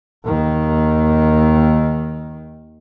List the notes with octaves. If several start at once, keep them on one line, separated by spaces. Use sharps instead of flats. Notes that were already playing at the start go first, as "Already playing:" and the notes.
D#2 D#3